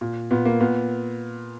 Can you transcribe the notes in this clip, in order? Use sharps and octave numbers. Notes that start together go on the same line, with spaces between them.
A#2
A#2 B3
A#3
A#2 B3